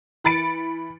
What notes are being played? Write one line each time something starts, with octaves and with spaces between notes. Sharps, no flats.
E3 B5 A6 C#7 D7